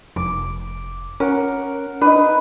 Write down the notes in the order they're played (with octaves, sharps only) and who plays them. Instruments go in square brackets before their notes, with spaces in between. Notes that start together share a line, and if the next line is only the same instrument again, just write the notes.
[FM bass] F1 [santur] D6
[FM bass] C#4 [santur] A#4 F#5
[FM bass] D4 [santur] D#4 B4